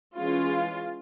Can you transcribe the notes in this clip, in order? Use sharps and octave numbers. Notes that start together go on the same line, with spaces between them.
E3 G#3 C#4 F4